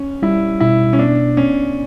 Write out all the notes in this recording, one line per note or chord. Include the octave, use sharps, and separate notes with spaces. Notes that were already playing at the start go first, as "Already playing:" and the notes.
Already playing: C#4
G3 E4
B2 E4
C#4
B3 D4
B3 C#4